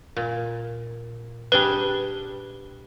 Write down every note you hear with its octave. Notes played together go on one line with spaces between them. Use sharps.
A#2
G3 D4 G#4 B4 G7